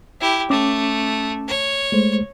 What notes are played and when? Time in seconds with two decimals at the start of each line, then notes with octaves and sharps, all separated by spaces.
0.21 E4 G4
0.50 A3 C#4 D6
1.48 C#5
1.92 G#3 A3 C5